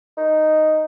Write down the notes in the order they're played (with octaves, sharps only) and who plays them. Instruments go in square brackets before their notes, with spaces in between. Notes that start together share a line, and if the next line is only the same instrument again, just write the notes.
[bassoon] D#4